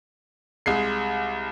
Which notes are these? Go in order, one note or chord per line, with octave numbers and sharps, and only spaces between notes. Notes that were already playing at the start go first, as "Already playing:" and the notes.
C2 G#3 C7